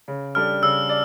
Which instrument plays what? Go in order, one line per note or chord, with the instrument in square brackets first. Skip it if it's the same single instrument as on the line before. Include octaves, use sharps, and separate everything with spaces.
[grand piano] C#3
[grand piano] G3 D4 A4 D5 [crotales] F6
[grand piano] C#3 [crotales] E6
[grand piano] D5